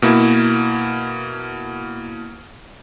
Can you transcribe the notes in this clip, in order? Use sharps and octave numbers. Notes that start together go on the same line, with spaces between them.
B2 A#3 E4